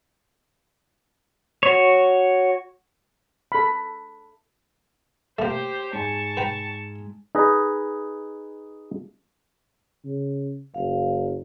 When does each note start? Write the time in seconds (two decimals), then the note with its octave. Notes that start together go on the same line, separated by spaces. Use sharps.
1.63 F#4 C#5
3.52 A4 B5
5.39 A3 A#3 G4 C5 G5
5.93 G#2 G#5 A5 C#6
6.37 B4 G5 A#5
7.35 D#4 G#4 B4 D#5
10.05 C#3
10.74 F#1 F5